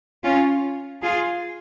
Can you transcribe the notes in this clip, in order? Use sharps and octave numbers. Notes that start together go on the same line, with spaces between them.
C#4 F4
F4 G#4